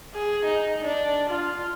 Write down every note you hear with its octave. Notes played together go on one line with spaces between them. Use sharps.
G#4
D#4
D4
F4